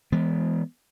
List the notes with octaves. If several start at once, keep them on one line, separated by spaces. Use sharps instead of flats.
E3 G#3 B3